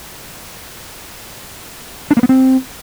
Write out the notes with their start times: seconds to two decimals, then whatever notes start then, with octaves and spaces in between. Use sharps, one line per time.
2.11 D4
2.17 A#3
2.23 B3
2.29 C4